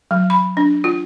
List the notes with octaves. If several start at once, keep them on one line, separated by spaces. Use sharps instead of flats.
F#3
B5
D4
F4